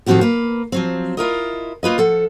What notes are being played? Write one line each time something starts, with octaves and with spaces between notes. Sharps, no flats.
A2 D#3 F3 C4 F#4 G4
A#3 B4
F3 F#3 C4
E4 F4 A#4 D#5
A#3 F4 B4 D#5
F3 A4 F#5